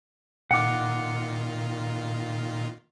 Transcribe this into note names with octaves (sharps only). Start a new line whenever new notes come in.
A#2 D#3 F4 F#5 D6